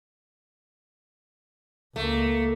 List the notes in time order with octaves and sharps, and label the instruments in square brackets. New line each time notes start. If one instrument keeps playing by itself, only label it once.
[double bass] C#2 A#3 [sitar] A3